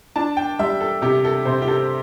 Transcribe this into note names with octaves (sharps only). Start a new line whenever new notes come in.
D4 A5
G5
G3 E5
A4
C3 G4
A4
C3 C5
G4
A4